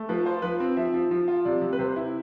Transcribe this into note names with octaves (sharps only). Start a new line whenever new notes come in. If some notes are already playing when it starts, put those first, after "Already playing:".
Already playing: A3
F3 B4
F4 C5
F3 B4
C4
F3 E5
F3
F3
F4
C3 D5
C3
B4
C3 C5
E4